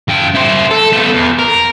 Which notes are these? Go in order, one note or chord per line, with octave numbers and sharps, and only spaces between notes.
F#2 G5
E4 C5
A4
A3 B3
E2
A#4